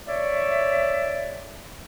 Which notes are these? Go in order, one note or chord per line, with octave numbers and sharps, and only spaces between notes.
C#5 D5 E5